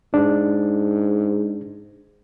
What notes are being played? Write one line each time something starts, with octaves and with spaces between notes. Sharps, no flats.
G#2 D4